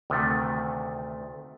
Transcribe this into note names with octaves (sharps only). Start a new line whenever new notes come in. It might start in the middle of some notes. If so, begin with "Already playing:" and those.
D2 C3 D#3 A3